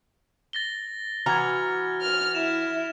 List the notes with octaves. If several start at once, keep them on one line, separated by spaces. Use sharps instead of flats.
A6 A#6 G7
E3 F#4 A#5 F6 G#6
F6
E4 E7